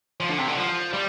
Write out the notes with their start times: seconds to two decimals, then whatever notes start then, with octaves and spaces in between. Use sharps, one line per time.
0.20 F3
0.30 D3
0.38 C3
0.48 D3
0.57 F3
0.93 G3